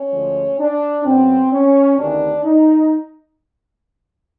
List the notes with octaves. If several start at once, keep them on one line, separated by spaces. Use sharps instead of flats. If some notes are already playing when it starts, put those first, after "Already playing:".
Already playing: C#4
D2 D3 F3 G#3
D4
F#2 C#3 F#3 B3 C4
C#4
D2 C3 D#3 D4
D#4